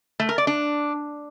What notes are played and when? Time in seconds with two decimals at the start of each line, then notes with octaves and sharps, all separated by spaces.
0.20 A3
0.29 A#4
0.38 D5
0.47 D4